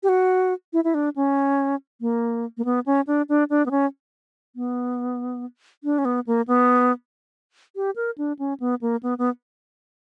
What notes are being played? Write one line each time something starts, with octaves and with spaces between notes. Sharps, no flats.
G4
F#4
E4
E4
D4
C#4
A#3
A#3
B3
C#4
D4
D4
D4
B3
C#4
B3
D4
C#4
B3
A#3
B3
G4
A#4
D4
C#4
B3
A#3
B3
B3